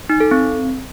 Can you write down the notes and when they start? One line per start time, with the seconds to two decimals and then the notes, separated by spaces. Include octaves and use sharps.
0.09 D#4
0.20 A4
0.31 C4